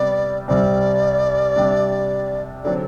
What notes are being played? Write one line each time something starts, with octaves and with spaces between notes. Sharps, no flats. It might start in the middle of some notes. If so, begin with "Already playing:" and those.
Already playing: C3 G3 B3 D5
C2 C3 G3 C4 D5
C3 G3 D4
D3 F#3 C4 D5